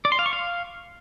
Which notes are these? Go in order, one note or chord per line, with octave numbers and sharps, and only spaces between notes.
D5
C6
F5
C#6
F5